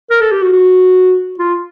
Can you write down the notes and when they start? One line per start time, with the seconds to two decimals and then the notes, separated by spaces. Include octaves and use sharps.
0.10 A#4
0.21 A4
0.31 G4
0.42 F#4
0.53 F#4
1.39 F4